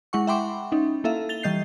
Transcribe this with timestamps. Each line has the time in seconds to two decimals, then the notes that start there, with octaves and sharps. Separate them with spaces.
0.13 G#3 E4 F#5 C#6
0.27 E5 F#5 G5 B5 C6 D6
0.72 C#4 D#4
1.04 A#3 E4 A4 E5 F5
1.29 A6 F7 G7
1.43 E3 G3 D#5 G6 C7